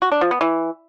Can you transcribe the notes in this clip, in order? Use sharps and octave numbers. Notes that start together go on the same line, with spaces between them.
F#4
D4
F3
B3
E3